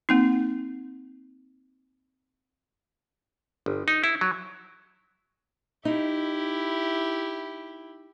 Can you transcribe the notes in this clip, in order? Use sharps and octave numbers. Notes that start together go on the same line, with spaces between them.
A#3 C4 D#4
G1
D#4
E4
F#3
D#4 E4 G4